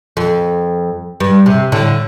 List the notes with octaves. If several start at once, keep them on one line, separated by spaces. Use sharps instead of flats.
F2
G2
C3
A2 D3